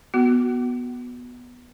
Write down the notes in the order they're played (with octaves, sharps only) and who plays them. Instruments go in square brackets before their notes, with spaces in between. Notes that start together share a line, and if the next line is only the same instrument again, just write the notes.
[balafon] B3 F#4